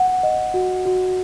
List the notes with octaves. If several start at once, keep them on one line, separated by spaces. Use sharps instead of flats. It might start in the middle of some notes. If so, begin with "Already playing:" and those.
Already playing: F#5
D#5
F#4
F#4